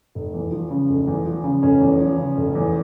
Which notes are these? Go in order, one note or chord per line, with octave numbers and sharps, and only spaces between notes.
F1
E2
F3
C#3
F1
E2
F3
C#3
F1 C#4
E2
F3
C#3
F1
E2